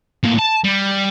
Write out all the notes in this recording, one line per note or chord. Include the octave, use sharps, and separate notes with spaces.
A2 A#3
A5
G3